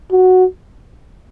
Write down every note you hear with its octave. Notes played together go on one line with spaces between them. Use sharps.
F#4